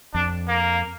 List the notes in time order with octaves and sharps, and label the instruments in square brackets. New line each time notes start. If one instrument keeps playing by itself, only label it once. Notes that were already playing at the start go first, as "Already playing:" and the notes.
[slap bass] F2 [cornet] D4
[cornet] A#3